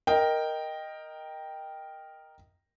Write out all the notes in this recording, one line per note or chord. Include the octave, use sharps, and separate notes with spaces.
A#4 D#5 G5